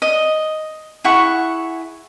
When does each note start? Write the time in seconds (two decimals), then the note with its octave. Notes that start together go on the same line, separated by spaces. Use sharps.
0.02 D#5
1.04 E4 G#4 F#5 C#6